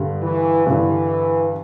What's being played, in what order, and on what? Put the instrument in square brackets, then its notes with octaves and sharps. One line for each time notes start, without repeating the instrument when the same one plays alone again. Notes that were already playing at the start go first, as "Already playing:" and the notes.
Already playing: [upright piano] G2 D3 G3
[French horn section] E3
[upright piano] G2 D3 G3 [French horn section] E3